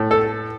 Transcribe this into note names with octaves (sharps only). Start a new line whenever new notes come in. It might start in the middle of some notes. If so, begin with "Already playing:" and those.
Already playing: A2
A4